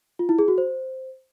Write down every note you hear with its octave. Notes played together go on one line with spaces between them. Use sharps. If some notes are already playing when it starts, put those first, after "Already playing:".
F4
E4
G#4
F#4
C5